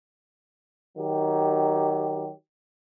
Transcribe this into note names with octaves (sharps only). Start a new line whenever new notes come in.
D#3 F#3 G4